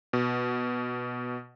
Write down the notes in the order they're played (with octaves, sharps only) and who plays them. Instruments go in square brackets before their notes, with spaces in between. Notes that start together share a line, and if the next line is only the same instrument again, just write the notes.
[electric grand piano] B2